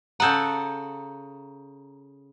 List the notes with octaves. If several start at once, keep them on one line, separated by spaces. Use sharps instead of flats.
C#3 A4 F#5 A#5 D#6 G6